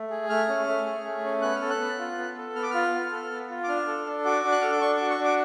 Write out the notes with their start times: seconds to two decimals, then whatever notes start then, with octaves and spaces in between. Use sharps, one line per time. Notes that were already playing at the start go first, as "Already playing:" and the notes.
Already playing: A3
0.10 G#4
0.29 A3 F6
0.48 C#4
0.67 A3
0.86 G#4
1.05 A3
1.24 C#4
1.42 B3 F#6
1.56 F6
1.61 A4
1.70 F#6
1.80 B3
1.99 F4
2.18 B3
2.37 A4
2.55 B3 F6
2.63 D6
2.70 F4 F6
2.94 B3
3.12 A4
3.31 B3
3.50 F4
3.64 D6
3.69 D4 F6
3.88 A4
4.07 D4
4.25 F#4 D6
4.44 D4
4.52 F#6
4.61 A4 F6
4.72 D6
4.81 D4 C#6
4.96 F#4 D6
5.10 C#6
5.19 D4
5.25 D6